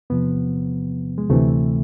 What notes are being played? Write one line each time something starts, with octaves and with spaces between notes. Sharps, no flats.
E2 C3 F3 B3
G#3
D2 C3 E3 A3